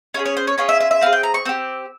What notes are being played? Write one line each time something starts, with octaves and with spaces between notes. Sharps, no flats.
C#4 F4 G#4 C#5
C#5
C5
C#5
C#4 F4 G#4 C#5
E5
E5
E5
C4 E4 G#4 F5
G5
A#5
C#6
C4 G4 E6